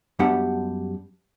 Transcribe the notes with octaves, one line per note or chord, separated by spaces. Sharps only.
F#2 G3 B3 D4 G4 F#5